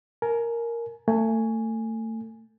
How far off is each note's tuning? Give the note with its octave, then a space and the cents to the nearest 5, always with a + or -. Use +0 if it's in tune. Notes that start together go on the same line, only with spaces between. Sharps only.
A#4 +0 G#5 +30
A3 +30 G#5 +0